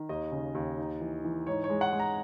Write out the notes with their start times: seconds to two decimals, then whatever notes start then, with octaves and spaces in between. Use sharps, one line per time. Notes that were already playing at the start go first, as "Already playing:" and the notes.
Already playing: D#3
0.09 D#2 D#5
0.32 C#3
0.55 D#2
0.78 D#4
1.01 E3
1.24 E3
1.47 G#2 C#5
1.64 C#5
1.70 G#3
1.81 F#5
1.93 G#3
2.00 A#5